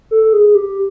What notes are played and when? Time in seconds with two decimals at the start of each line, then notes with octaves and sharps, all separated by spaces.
0.11 A4
0.33 G#4
0.55 G4